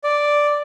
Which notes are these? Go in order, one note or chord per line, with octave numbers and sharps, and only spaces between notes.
D5